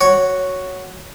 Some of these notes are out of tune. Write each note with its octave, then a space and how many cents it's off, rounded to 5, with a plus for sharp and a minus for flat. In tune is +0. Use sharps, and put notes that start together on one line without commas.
F#4 +0 C#5 +0